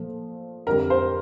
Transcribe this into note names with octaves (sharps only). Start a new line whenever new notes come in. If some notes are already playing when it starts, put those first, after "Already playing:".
Already playing: A#2 F3 A3
F2 D3 G3 A#4
C5